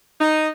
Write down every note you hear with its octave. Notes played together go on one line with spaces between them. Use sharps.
D#4